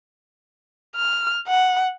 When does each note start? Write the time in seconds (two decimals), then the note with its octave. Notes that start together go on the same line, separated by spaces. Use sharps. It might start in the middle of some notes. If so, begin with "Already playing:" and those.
0.96 F6
1.48 F#5